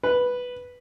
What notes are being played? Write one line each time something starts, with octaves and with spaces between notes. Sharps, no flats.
B4